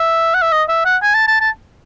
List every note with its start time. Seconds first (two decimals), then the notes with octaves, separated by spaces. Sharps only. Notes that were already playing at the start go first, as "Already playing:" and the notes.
Already playing: E5
0.34 F#5
0.42 E5
0.52 D#5
0.69 E5
0.85 F#5
1.02 G#5
1.15 A5
1.28 A5
1.41 A5